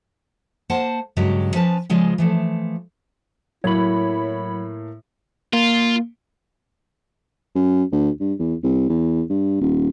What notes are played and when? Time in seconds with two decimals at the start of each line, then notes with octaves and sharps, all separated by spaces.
0.70 A#3 C5 F#5 A5
1.17 G2 C#3 F#3 G#3
1.54 F3 C#4 B4 A5
1.90 C#3 F3 G#3 F4
2.18 E3 F3 A3
3.64 A2 F#3 A#3 E4 C#5 B5
5.53 A#3 F4
7.55 F#2
7.92 D2
8.20 G2
8.39 E2
8.63 C2
8.89 E2
9.30 G2
9.61 D#1